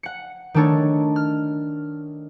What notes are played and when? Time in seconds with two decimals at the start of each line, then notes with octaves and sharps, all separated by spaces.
0.03 F#5 C#7
0.54 D#3 A3 D4 A4 C#5
1.16 F6